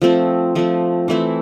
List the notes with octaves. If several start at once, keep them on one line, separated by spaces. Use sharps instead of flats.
F3 A3 C4
F3 A3 C4
E3 A3 C4 E4